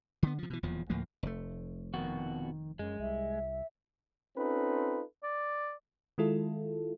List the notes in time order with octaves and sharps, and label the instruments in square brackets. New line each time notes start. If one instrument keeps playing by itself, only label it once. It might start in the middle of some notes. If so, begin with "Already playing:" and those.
[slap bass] D3 B3
C3 F3
B2 E3
D#1 E2 A#2 F3
D2 A2 F3 A#3
F1 A3
[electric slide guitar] F2 B2 F#4 [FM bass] D#3
[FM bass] F#2 [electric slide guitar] G#3
[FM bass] C2 [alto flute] E5
[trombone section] C4 C#4 D#4 F4 A4 B4
[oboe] D5
[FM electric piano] D#3 G#3 E4 F4 A4